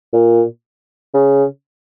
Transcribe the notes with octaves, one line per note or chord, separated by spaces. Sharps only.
A#2
C#3